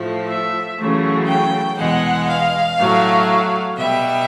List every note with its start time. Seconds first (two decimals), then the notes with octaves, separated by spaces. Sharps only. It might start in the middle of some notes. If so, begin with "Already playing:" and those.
Already playing: A2 F3 A3
0.26 E5
0.76 F#2 C#3 E3 A3
1.26 G5
1.77 E2 B2 G#3 F#5
2.27 F5
2.78 A2 F#3 A3
3.77 B2 G3 E5